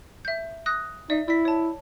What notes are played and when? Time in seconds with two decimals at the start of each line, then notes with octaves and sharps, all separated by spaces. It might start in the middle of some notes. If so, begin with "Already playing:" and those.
0.25 E5 G6
0.66 D#6 F#6 A#6
1.10 D#4 D5 E5
1.28 E4 D5 B6
1.45 C#5 A5